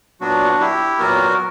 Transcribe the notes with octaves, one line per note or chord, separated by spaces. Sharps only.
A#2 F#3 B3 D4 F#4
E4 G4
A#2 F#3 B3 F#4 A#4